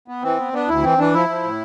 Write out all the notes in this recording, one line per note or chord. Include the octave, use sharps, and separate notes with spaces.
B3
E3 C4
B3
B3 D4
D2 E4
E3 C4
E3 D4
F3 E4
F3
A2